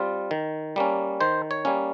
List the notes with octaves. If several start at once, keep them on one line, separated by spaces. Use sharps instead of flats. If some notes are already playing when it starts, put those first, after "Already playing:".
Already playing: G3 C4 F4
D#3
G3 A#3 C#4
D#3 C5
C#5
G3 A#3 C#4